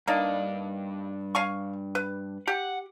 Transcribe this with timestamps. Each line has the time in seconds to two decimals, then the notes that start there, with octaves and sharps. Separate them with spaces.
0.08 G2 A#3 D4 D#4 D5
1.35 F5 G#5 C#6
1.95 B4
2.47 G4 F#5